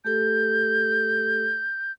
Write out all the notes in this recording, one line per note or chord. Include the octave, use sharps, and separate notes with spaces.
A3 G4 A4 G6